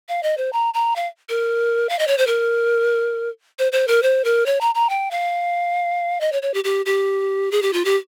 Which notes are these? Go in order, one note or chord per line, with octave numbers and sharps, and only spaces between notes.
F5
D#5
C5
A#5
A#5
F5
A#4
F5
D#5
C#5
C5
A#4
C5
C5
A#4
C5
A#4
C#5
A#5
A#5
G5
F5
D#5
C#5
C#5
G4
G4
G4
G#4
G4
F4
G4